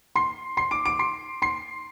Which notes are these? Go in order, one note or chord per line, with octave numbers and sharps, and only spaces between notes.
C6 C7
C6 C7
D6 D7
D6 D7
C6 C7
C6 C7